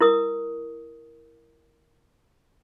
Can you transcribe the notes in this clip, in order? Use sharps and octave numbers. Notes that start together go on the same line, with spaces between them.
E4 A#4 D#6